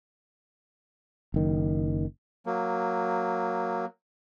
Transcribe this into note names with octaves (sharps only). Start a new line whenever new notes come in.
F#1 D#3
F#3 A#3